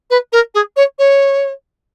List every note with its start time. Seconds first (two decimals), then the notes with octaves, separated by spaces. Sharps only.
0.10 B4
0.32 A#4
0.54 G#4
0.76 C#5
0.99 C#5